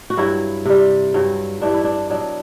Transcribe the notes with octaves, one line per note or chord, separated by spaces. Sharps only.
F#4
G2 F#3 E4
C3 G3
G2 F#3
G2 E3 G3 D4
E4
D4
B2 F#3 D4